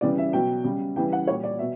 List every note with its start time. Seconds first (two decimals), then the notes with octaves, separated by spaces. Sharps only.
0.01 C#3 E3 G3 D5
0.18 E5
0.33 B2 F#3 G5
0.64 C#3 G3
0.96 C#3 E3 G3 G5
1.13 F#5
1.27 A#2 G3 C#5
1.44 D5
1.59 B2 E5